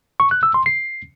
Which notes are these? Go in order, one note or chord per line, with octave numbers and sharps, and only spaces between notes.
C#6
F#6
E6
C6
C7